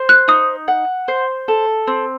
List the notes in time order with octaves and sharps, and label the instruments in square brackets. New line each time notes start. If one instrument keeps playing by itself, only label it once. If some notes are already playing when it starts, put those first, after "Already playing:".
Already playing: [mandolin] C5
[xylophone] F#6
[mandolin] D#4 [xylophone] D#6
[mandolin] F#5
C5
A4
C4